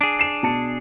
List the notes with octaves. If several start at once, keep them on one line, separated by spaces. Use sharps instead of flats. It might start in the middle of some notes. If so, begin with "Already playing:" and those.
D4 G#4
C7 E7
B2 A5 C#7